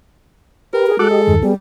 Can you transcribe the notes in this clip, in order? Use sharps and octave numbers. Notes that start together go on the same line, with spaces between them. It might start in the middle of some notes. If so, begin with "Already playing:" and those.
G4 A#4 B4
G#4
G#3 F#4 A4 D6 F#6
G4 D#5
E2 G2 D#3
G3 B3 G#4